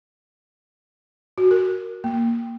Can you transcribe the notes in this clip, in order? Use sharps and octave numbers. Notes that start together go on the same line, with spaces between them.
F#4
A#4
A#3